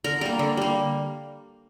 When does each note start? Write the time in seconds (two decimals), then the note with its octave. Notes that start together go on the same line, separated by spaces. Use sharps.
0.04 D3 A#4
0.21 G3 A#3 A#4
0.39 D3
0.57 G3 A#3